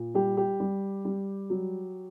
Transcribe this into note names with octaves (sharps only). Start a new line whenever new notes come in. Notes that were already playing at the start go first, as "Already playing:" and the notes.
Already playing: A#2
G3 G4
G4
G3
G3
F#3